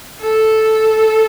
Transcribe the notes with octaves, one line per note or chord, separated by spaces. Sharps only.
A4